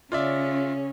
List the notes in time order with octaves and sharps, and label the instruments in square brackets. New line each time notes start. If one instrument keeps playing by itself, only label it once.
[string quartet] C#3 C#4 [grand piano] F4 D5 E5